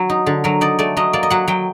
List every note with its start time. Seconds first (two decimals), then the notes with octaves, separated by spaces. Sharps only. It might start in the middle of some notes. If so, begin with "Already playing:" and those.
Already playing: F#3
0.10 D#4
0.26 D3
0.44 F#3 A#4
0.61 D#4 D5
0.79 A3 D5
0.97 F#3 D#5
1.13 A#3 D5
1.23 D#5
1.30 F#3 F#5
1.48 F#3 G5